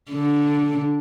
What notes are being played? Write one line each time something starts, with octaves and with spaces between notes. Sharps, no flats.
D3